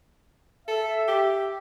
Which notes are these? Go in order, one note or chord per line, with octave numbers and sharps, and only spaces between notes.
A4 E5
G4